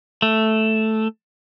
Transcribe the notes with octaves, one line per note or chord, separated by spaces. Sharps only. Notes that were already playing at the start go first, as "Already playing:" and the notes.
A3